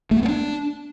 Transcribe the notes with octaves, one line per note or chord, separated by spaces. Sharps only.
A3
A#3
B3
D4